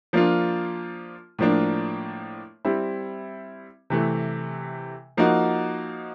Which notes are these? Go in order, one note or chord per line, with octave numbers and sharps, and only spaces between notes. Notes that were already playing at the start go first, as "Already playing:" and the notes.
F3 A#3 D4 F4
A2 F3 A#3 D4
G3 C4 E4
C3 E3 A3
F3 A#3 D#4 F#4